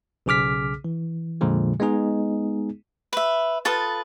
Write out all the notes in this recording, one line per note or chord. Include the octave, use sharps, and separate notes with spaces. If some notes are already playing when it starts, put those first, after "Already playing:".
B1 C#3 G#4 D6 F6 B6
E3
F2 A#2 D3 F3 G#3
G#3 B3 D#4 G#4
B4 E5
F4 A4 B4 D#6